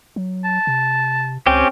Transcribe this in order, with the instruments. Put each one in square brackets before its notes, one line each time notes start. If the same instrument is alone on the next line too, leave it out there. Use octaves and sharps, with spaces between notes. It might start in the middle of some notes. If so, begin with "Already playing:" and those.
[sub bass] F#3
[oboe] A5
[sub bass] C3
[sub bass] C#2 [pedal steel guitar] C4 C#4 G4